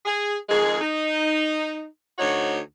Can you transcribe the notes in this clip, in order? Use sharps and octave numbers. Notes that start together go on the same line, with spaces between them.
G#4
F2 D#3 G#3 G#4
D#4
D2 D#4 F#4 C#5